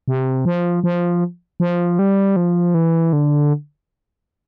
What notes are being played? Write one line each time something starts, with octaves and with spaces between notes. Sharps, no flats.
C3
F3
F3
F3
G3
F3
E3
D3